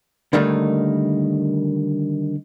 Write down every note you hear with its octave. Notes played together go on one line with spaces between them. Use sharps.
D3 D#3 G3 A3 A#3 D#4